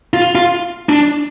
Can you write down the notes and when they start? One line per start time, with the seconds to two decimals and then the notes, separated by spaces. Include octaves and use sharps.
0.14 F4
0.35 F4
0.89 D4